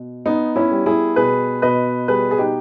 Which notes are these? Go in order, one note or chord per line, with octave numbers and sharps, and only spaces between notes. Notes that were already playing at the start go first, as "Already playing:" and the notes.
Already playing: B2
B3 D#4
C#4 E4
G3
E4 G#4
B2 G#4 B4
B2 B4 D#5
G3 G#4 B4
G#4
D#4 G4